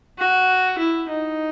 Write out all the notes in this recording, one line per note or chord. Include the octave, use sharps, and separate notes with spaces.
F#4
E4
D#4